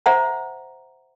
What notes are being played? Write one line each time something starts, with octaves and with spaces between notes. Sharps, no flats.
C5 E5 F#5 A#5